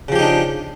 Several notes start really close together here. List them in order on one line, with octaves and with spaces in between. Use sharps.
C#3 F3 G4 D#4 D4